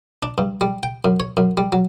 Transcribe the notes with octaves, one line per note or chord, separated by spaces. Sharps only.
D4
G2
G3
G5
F#2
C#5
F#2
G3
F#3